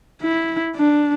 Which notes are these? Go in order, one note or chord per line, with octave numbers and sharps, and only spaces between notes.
E4
D4